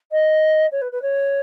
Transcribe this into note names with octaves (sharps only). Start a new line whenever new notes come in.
D#5
C#5
B4
B4
C#5